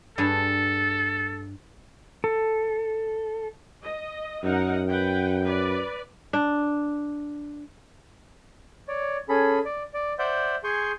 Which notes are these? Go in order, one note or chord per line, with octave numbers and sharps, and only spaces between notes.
G2 G#4 A4 G#5
A4
D#5
F#2 D#4 A#4 F#5
B4 F#5 G5
B4 D5
D4
C#5 D5
C#4 G#4 A4 B5
D5
D5
C5 D5 E5 F#5 G6
G#4 G#5 C6 C#6 G6